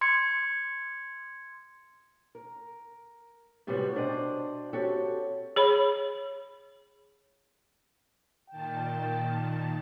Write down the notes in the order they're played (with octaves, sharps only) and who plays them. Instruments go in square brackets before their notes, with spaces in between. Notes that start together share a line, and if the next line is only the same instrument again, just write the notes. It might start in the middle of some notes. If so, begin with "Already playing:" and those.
[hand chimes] C6 G#6 C#7
[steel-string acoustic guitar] A#4
A2 C3 G3 G#3 B3 F#4
B2 D4 C5 D5 D#5 G5
C4 F#4 G4 A4 C#5
[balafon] G#4 C#5 B5
[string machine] A#2 D#3 A5 [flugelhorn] G5